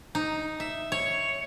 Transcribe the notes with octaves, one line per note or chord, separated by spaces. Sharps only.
D#4
E5
C#5